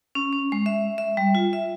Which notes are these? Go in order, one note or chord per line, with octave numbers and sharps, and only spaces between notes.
C#4
C#4
G#3
E5
E5
G3
F4
E5